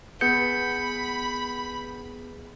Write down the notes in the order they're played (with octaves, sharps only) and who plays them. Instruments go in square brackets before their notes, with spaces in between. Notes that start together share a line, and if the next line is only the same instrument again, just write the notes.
[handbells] B3 G#4 B4 [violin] B5 [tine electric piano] G6 C#7